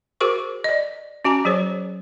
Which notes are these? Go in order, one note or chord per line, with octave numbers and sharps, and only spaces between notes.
F#4 G#4 A#4 C5 C#6 D6
D5 D#5
C#4 F#4 G#5 A#5
F#3 G#4 C5 C#5